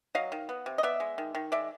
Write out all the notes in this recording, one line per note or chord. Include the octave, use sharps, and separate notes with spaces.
F#3 D#5 F5
D#3
B3
C3
D#5
B3 D5 E5
G#3
D#3
D#3
G#3 D5 E5